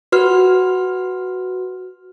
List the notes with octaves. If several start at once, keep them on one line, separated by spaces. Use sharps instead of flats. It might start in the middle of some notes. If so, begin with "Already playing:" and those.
F#4 B4 F6